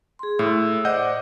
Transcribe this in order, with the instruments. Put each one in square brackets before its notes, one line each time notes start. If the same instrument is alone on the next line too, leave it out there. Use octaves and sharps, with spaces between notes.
[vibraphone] G#4 C6
[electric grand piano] A2 [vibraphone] E6
[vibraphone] C5 D5 D6 [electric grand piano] D#5 F#5 G6